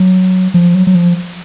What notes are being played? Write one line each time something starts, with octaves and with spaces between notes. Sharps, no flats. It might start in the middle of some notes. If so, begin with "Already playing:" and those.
Already playing: F#3
F3
F#3
F#3
F3